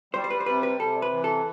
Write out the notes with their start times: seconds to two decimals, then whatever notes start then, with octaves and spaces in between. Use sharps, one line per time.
0.14 G3 C5
0.24 C5
0.30 B4
0.40 C5
0.46 C3 B4
0.63 B4
0.80 C3 A4
1.02 B4
1.12 E3
1.24 A4